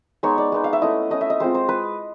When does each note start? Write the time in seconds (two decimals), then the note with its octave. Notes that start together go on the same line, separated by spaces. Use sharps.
0.23 G#3 B3 D#4 C#5
0.38 D5
0.52 G#3 B3 D#4
0.64 F5
0.73 E5
0.81 A3 C#4 E4 D#5
1.10 A3 C#4 E4 D#5
1.21 E5
1.30 D#5
1.40 G#3 C4 F4 C5
1.55 C5
1.69 G#3 B4